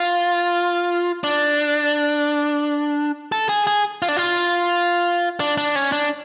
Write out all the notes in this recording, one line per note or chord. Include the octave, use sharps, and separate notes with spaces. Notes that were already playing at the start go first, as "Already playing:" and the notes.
Already playing: F4
D4
A4
G#4
G#4
F4
D4
F4
D4
D4
C#4
D4